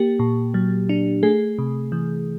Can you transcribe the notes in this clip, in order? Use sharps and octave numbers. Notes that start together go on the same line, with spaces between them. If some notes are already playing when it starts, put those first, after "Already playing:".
Already playing: A#3 G4
A#2
F#3
D4
A3 G#4
C3
E3